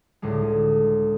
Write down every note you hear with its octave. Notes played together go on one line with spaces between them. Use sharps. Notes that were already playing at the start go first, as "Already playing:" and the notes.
C#2 A2 D3 G#3